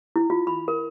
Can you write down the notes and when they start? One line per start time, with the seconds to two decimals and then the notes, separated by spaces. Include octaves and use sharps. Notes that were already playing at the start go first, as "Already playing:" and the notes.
0.16 E4
0.30 F4
0.47 B5
0.68 A#4